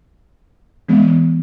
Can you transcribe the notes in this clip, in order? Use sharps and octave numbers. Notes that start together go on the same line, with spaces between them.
E3 G#3 B3